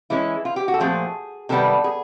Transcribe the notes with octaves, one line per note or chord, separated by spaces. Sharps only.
E3 G#3 C#4 E4
F4
G4
F#4
A4
A#2 F3 A3 C4 G#4
C3 D#3 G3 B3 A4
G#4